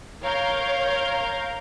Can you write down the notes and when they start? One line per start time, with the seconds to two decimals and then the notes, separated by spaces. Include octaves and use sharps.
0.23 A#4 C#5 F5 G6